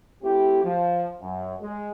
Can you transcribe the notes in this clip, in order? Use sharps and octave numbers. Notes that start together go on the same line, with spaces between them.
A3 C4 E4 G4
F3
F#2
G#3